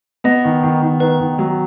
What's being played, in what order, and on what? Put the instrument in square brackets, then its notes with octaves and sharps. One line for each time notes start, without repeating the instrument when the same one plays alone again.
[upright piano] B3 [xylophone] D#5
[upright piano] D#3
D#3
D#3
[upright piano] D#3 [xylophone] B4
[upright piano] D#3
F#3